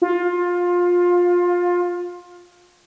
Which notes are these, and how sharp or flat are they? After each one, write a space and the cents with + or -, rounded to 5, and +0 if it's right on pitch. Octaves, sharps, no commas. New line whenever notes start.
F4 +20